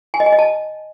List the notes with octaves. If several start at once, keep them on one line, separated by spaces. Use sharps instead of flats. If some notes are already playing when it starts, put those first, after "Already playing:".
G#5
D#5
G#5
D#5
A5